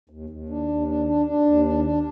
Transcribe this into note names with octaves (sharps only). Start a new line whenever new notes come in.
D#2
D#2
D4
D#2
D4
D4
D4
D#2
D4
D4